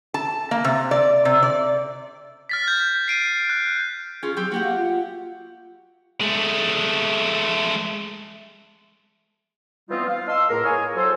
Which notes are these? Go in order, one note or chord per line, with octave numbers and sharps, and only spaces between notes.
A5
A#3
C3
D5
C3
D5
F6 A6 B6
G6
C7 D7 D#7
F#6
C#4 F4 G#4
F#3 C4 G4
A#3 F#4 G4 F#5
F5
F4
G#3 A3
E3 G3 B3 C4 D#4 F4
F5
D#5 A5 C6 E6
C#2 A2 A#3 A#4
A#3 E4 G#4 C#5 G#5
F#3 A4 C5